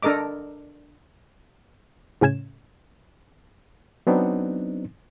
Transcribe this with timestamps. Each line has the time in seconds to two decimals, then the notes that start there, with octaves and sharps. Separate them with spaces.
0.02 D4 A4 A#4 D#5 D6
2.21 A2 C#3 C#4 G#6 E7
4.07 F#3 B3 C4 D4 D#4